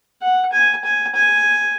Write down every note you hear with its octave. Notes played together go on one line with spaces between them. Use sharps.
F#5
G#5
G#5
G#5